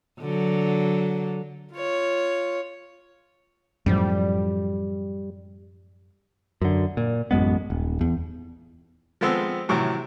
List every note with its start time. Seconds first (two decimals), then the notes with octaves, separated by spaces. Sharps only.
0.20 D3 F#3
1.73 F4 C#5
3.86 F#2 A2 F3 G3
6.61 F#2 D3
6.97 A#2
7.31 A1 F#2 G#3 B3
7.70 D#1
8.01 E2
9.21 F3 G#3 B3 C4 A4
9.69 A2 C3 E3 F#3